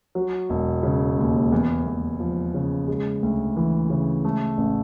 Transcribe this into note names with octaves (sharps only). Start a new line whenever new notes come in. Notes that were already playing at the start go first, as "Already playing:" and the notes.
F#3
E1
C#3
D#2
E2
E2
F3
C#3
G#3
D2
E3
C#3
A3
A1